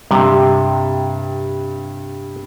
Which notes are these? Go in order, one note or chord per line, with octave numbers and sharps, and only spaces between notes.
G2 C3